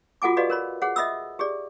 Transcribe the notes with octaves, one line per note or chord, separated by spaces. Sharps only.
F4 F#4 A4 F#5 G#5 D6
F#4 G4 B4 D5 D#5 F5
A#4 C#5 B5
G#4 C#5 F#5
D#5 E5 B5 D#6 E6
G4 G#4 D5